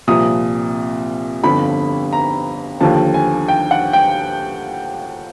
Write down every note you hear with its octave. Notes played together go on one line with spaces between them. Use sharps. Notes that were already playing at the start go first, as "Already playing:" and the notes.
C2 A#2 F3 D#6
G1 F2 D3 F3 B5
A#5
D#2 D3 F3 A5
G#5
G5
F#5
G5